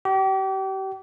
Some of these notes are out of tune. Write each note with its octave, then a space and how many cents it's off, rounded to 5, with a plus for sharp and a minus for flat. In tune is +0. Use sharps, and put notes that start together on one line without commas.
G4 -35